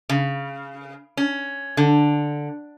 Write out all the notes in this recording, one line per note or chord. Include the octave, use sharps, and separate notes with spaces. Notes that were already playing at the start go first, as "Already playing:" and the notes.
C#3
C#4
D3